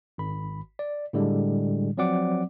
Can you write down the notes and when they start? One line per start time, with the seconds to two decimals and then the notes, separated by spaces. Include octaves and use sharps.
0.18 G#1 B5
0.79 D5
1.13 A2 D3 G3 G#3
1.98 F3 F#3 C4 D5 F#5 D6